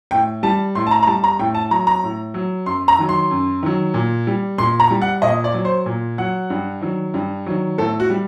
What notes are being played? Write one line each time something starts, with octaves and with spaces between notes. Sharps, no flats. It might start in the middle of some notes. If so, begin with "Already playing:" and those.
A2 G5
G3 A5
A2 C6
A5
A#5
A#5
G3 A5
A#5
A2 G5
A5
F#3 A#5
A#5
A2
F#3
F#2 C6
A#5
D#3 F#3
C6
F#2
D#3 F#3
A#2
G3
A#2 C6
A#5
G3
F#5
A#2 D#5
D5
F#3
C5
A#2
F#3 F#5
G2
D#3 F#3
G2
D#3 F#3
A2 A4
F#4
G3